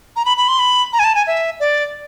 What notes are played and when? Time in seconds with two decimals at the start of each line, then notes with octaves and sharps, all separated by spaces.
0.16 A#5
0.25 B5
0.38 B5
0.48 C6
0.59 B5
0.93 A#5
0.99 G#5
1.04 A5
1.15 G#5
1.27 E5
1.60 D5